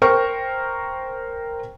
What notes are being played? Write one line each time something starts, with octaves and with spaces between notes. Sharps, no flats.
A#4 C5 G5 C#6